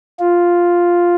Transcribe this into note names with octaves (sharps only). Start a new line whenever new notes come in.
F4